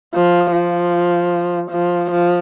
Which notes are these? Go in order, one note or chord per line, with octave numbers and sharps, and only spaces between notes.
F3
F3
F3
F3